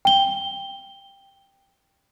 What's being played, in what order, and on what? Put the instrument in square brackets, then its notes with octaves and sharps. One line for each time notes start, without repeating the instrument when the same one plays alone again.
[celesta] G5 G7